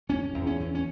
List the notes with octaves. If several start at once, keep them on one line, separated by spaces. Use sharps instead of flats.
F1 C#4
E2
C#4
E2
C#4